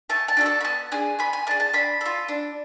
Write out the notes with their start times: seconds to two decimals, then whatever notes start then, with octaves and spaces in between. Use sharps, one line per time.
0.10 A3 A5
0.28 A5
0.37 D4 F#4 A4
0.46 A5
0.61 B5
0.64 B3 A5
0.92 D4 G#4 G#5
1.19 B3 B5
1.33 G#5
1.47 D4 G#4 A5
1.60 A5
1.73 D4 B5
2.01 F4 A4
2.28 D4